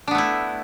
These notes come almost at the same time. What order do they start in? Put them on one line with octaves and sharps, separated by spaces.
D4 B3 A3 E4